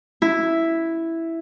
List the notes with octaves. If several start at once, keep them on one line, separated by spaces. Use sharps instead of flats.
E4